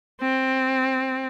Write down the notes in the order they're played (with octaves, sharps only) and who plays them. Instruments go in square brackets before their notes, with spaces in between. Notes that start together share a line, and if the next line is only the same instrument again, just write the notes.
[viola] C4